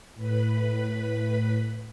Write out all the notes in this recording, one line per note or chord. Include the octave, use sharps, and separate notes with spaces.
A2 B4 B5